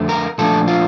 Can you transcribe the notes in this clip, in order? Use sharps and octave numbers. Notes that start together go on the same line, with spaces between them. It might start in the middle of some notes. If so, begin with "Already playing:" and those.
Already playing: F2 D3 A3
A#4
A#2 F3 A3 D4 A4
F4